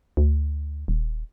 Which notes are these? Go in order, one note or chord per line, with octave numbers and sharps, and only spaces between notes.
D2
D#1